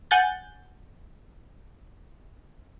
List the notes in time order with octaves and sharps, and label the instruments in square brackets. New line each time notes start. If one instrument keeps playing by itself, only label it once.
[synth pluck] F#5 G#5 F#6 G6 A6